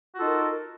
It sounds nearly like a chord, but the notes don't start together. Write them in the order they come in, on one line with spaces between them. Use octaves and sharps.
F#4 F4 A4 D#4 A#4